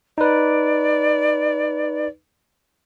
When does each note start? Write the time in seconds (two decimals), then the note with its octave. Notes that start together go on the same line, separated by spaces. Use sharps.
0.18 D#4 B4 D5